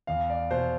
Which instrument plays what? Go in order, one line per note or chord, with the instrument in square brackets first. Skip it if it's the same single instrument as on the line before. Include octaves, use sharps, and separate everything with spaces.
[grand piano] E2 F5
D5
B2 C5